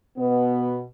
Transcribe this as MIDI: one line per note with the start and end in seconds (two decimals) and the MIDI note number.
0.18 0.83 47
0.18 0.83 59